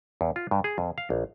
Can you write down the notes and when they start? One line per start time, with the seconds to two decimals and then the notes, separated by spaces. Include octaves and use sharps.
0.21 E2
0.36 F4
0.51 G2
0.64 G#4
0.78 F2
0.98 F5
1.10 A#1